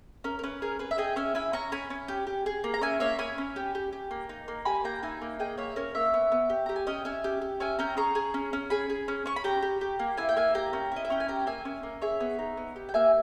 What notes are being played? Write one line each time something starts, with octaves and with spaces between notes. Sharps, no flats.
C#4 A#4
A#4
C#4 B4
G#4 A#4
G#4 B4
E5
G#4 D#5 G5
C#4 E5 G#5
E4 G#5 B5
C#4 A#5 C#6
C#4 G#5 B5
C#4
G4
G4
G#4
A#3
A#5
C#4 E5 G#5
A#3 C#5 E5
C#4 G#5 B5
C#4
G4
G4
G4
A#3
D#4
A#3
G4 G#5 B5
A#3 G5 A#5
D#4 E5 G#5
A#3
G#4 D#5 G5
A#3 C#5 E5
C#4 A#4 C#5
A#3 C#5 E5
B3
B3
G4
G4 A#5
G#5
C#4 D#5 G5
C#4 E5 G#5
G4
G4
C#4 E5 G#5
C#4 G5 A#5
G#4 A#5 C#6
G#4
C#4
C#4
G#4 G#5 B5
G#4
C#4
C#4 C#6
B5
G4 G5 A#5
G4
G4
A#3
E4 E5 G#5
G5
A#3 E5 G#5
G4 G5 A#5
C#4
E4 D#5
E5
C#4 G5
G#5
G4 G5 A#5
A#3 E5 G#5
C#4
A#3
G#4 C#5 E5
B3
D#4
B3
G4
G5
A#3 E5 G#5